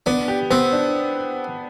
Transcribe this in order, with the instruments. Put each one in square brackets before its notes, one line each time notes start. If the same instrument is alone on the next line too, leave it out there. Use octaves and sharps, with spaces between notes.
[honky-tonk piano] B3 [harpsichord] D4
[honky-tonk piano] G4
[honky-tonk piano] B3 [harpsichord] C4
[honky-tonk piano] D4